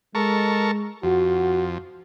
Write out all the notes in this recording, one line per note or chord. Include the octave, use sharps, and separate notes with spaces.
G#3 A4 A#4 C#6
F2 F#4